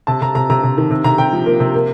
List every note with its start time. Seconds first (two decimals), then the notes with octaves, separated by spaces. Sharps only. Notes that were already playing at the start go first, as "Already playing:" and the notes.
0.07 C3 A5
0.21 C3 A#5
0.35 C3 A#5
0.50 C3 A#5
0.64 C3
0.78 D#3
0.91 C3
1.04 C3 A#5
1.18 C3 G5
1.33 F3
1.46 A#3
1.60 C3
1.75 A#3